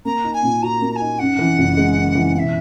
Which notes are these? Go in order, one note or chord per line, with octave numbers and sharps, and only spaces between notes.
A#3 A#5
D#4
G#5
A#2
F#4 A#5
A#3
A#5
D#4 G#5
F#2 F#5
E3
F#1
G#3
F#2
E3
B2 E5 F#5